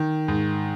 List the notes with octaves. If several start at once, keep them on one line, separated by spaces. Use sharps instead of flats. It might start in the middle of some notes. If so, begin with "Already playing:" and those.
Already playing: D#3
G#2